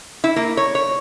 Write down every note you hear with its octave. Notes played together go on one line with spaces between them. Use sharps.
E4
A#3
C#5
C#5